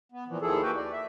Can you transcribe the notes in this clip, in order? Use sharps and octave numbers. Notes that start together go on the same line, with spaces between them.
B3
A#2 E3 F3
D#2 D#3 F3 E4 G#4 A4
A#3 F#4 B4 G5
D5
E5